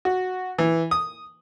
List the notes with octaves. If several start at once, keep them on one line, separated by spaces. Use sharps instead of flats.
F#4
E3
D#6